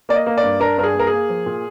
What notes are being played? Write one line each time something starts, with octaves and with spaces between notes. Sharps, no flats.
A#3 D5
D#5
A#3
D5
G2
D4 A#4
G2 A#4
G#4
A#3 A#4
G#4
A#3
F3
A#2